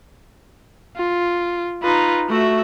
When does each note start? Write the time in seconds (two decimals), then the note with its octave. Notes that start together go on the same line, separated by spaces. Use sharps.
0.96 F4
1.83 D#4 F4 B4
2.29 A3 F#4 E5